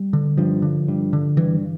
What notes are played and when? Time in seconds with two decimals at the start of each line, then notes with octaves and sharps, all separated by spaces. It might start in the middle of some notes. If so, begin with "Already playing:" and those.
Already playing: G3
0.13 D3
0.37 G2 F3
0.62 D3
0.88 G2
1.13 D3
1.37 G2 E3